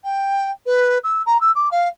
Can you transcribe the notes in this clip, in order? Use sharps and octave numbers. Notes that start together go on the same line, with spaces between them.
G5
B4
E6
A#5
E6
D6
F5